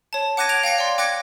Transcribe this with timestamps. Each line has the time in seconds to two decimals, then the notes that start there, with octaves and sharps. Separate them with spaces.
0.13 C#5 A5
0.37 F#5 D6 F#6 G#6 A#6 D#7
0.49 F#6 G#6 D7 F7
0.64 F5 G5 A#6 C#7
0.78 D5 C6
0.98 G5 D6 F#6 G#6 A#6 C#7